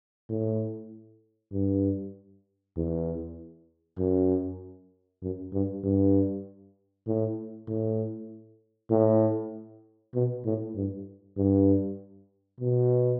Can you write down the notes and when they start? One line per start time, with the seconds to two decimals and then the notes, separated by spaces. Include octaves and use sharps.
0.30 A2
1.52 G2
2.76 E2
3.98 F#2
5.22 F#2
5.53 G2
5.84 G2
7.07 A2
7.68 A2
8.91 A2
10.14 B2
10.45 A2
10.75 G2
11.37 G2
12.60 B2